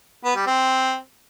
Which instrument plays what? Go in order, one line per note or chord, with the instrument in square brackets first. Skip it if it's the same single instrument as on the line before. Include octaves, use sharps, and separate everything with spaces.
[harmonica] B3
G3
C4